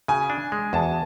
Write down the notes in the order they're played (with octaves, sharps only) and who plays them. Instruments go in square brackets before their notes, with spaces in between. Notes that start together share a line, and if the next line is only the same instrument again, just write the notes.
[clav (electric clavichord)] C#3 [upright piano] G#5
[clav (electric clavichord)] D4
G#3
[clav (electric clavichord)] E2 [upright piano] A5